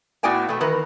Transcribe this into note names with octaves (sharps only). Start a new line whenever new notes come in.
A2 B3 F#4 D5 G5 G#5
B2 A3
D#3 E3 A#4 B4